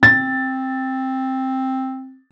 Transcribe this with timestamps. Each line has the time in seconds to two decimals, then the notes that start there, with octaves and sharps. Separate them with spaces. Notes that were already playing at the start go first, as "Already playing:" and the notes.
0.03 C4 A6